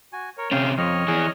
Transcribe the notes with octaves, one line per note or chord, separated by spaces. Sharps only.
F#4 G#5
A#4 C#5
C3 C#4 F5 G5
F2 C#5 D#5 F6
E3 G#4